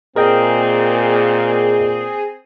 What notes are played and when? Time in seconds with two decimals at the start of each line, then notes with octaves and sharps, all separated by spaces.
0.16 A#2 C4 G#4 A#4 D#5 G5